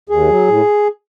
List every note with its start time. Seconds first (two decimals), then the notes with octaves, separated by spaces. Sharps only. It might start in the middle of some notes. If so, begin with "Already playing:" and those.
0.09 D#2 G#4
0.29 F#3
0.47 A2